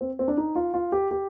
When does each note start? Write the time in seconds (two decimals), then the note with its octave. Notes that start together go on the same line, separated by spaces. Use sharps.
0.01 C4
0.19 C4
0.28 D4
0.37 D#4
0.56 F4
0.74 F4
0.92 G4
1.11 G4